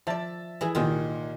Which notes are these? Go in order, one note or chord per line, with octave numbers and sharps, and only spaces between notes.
F3 D5 E5 A5 A6
E3 E4 G#4
C2 A#2 D#3 F4 D#5